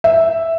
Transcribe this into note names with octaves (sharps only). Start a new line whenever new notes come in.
E5